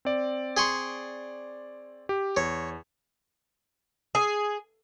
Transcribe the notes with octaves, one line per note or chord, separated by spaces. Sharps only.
C4 D5
G#4 C6 C#6
G4
E2 C#5
G#4